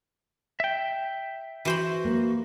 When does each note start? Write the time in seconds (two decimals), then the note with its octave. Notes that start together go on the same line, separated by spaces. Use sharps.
0.60 E5 G5
1.65 E3 F#4 C5 B5
2.05 A#3